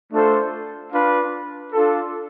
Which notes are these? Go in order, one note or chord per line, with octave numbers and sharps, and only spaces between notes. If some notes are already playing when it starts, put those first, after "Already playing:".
A3 D4 F4 A4 C5
D4 F4 B4 F5
D4 F4 A4